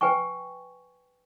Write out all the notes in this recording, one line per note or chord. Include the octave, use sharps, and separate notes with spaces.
B4 G5 G#5 C#6